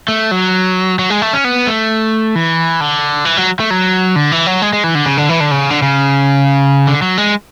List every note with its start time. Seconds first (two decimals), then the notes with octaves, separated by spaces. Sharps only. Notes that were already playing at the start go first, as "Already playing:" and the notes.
0.08 A3
0.31 F#3
0.99 F#3
1.10 G#3
1.22 A3
1.34 C#4
1.44 B3
1.67 A3
2.35 E3
2.81 D3
3.25 E3
3.37 F#3
3.60 A3
3.70 F#3
4.16 D3
4.32 E3
4.47 F#3
4.62 G#3
4.73 G#3
4.84 E3
4.95 D3
5.06 C#3
5.17 D3
5.29 E3
5.40 D3
5.51 C#3
5.70 D3
5.82 C#3
6.87 D3
7.02 F#3
7.18 G#3